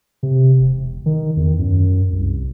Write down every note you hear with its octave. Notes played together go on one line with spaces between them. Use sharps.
C3
E1
D#3
E2
F#2
C2